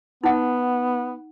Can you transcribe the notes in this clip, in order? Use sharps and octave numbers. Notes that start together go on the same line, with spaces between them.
B3 D#4 F#5